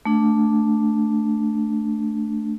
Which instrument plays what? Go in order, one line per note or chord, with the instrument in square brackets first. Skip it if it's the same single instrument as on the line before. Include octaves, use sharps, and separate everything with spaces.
[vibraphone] A3 D4